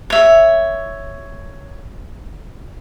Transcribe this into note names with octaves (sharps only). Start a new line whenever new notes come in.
C#5 E5